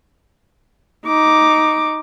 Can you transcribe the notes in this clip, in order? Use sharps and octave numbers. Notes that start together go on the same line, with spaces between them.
D#4 D6